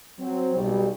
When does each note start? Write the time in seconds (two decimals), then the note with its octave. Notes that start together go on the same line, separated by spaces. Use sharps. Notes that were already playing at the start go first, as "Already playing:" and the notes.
0.19 F#3 C4
0.55 B1 G3